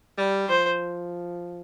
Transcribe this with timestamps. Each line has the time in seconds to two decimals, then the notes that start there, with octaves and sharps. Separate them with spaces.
0.18 G3
0.49 F3 C5